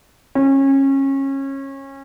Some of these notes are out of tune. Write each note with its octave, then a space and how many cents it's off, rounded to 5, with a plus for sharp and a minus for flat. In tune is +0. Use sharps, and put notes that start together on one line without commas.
C#4 -25